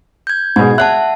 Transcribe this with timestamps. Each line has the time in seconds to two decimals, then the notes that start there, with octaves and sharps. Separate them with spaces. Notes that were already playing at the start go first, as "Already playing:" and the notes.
0.27 G6 G#6
0.56 G#2 B2 G#4 G#6
0.78 E5 F#5 A5 F#6